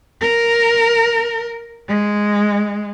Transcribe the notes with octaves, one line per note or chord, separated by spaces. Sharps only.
A#4
G#3